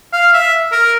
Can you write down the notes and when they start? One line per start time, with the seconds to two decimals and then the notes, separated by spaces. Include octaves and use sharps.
0.13 F5
0.33 E5
0.72 A#4